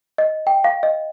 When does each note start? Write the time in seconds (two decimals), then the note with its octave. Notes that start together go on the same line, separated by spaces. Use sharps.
0.18 D#5
0.47 G5
0.64 F5
0.83 D#5